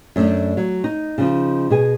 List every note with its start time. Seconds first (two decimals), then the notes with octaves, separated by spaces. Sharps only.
0.16 F#2 A3 D4
0.57 F#3
0.84 D#4
1.18 C#3 F3 D#4
1.70 B2 G#4 G#5